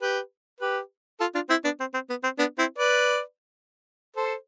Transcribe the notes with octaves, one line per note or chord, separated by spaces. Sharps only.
G4 B4
G4 B4
F4 A4
D4 F4
C4 E4
B3 D4
C4
C4
B3
C4
B3 D4
C4 E4
B4 D5
A4 C5